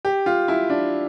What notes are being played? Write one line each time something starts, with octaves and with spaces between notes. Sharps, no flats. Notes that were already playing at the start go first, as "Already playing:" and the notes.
G4
F4
E4
D4